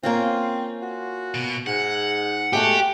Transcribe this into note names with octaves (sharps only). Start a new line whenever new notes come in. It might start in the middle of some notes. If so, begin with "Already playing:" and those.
A#3 C4 C#4 F4
F#4
B2
G#2 F#5
G#3 A3 F#4 G4